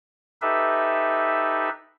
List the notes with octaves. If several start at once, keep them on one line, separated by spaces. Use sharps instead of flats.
D#4 G4 A4 B4 E5